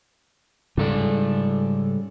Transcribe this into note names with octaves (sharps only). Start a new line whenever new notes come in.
G#2 C#3 G3 A4 D5